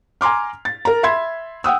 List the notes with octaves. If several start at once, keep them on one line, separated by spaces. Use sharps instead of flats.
G#5 A#5 C6 D6 F6
A6
A#4 A#5
E5 B5 C6 G#6
F#5 G5 D#6 E6